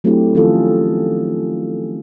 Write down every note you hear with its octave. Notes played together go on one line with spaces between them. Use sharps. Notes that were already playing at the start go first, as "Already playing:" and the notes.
F#3 A3 C4 D4 E4 G4
D#3 F3 C#4 F4 G#4 A4